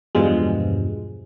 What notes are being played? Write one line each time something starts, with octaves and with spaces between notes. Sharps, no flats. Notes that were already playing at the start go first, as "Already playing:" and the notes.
E2 G2 B2 F3 G3 G#3